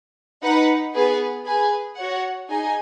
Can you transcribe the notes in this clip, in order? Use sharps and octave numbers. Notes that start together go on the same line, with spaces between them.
D#4 B4 F#5
B3 G#4 B4
G#4 B4 G#5
F#4 C#5 F#5
D#4 G#4 D#5 G#5